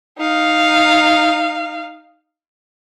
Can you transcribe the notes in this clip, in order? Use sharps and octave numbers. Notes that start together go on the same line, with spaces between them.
D#4 F5